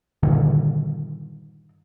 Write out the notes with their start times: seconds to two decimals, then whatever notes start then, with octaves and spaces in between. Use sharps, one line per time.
0.23 G2 A#2 D3 D#3